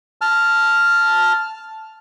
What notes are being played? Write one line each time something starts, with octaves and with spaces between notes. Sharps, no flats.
A5 F6